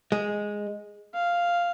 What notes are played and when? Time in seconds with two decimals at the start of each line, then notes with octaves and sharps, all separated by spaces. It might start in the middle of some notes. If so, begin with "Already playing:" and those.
0.12 G#3
1.14 F5